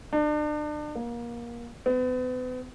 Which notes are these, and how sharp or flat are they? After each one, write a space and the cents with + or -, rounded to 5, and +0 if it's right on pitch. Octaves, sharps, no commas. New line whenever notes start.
D4 +35
A#3 +25
B3 +40